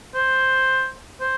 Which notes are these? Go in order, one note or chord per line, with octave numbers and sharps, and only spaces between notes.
C5
C5